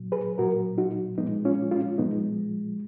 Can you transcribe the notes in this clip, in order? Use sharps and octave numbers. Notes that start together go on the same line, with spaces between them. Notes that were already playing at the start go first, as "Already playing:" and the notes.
Already playing: A#2 F#3
G#4 B4
A#2 F#3 F#4 A#4
D#4 F#4
A#2 F3 G#3 B3 D#4
C#4 F4
C#4 F4
A#2 F3 G#3 B3 D#4